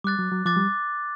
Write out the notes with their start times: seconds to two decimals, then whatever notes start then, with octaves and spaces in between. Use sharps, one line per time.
0.04 G3 D6 F#6 A6
0.19 F#3
0.32 F#3
0.45 F3 D6 F#6 A6
0.56 G3